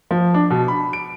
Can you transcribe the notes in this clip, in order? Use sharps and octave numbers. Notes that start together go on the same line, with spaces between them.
F3
D4
B2
B5
D7